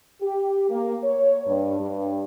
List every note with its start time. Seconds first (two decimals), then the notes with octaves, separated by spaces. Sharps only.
0.21 G4
0.70 A#3
1.04 C#5
1.46 G2
1.79 G2